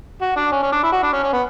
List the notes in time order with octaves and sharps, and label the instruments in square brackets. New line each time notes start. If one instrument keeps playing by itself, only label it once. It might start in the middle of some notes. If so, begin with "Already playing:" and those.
[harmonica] F#4
D4
C#4
C#4
D4
E4
F#4
D4
C#4
C#4
B3